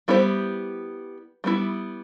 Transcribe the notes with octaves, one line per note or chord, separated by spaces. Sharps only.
G3 B3 E4 G4 C5
G3 B3 E4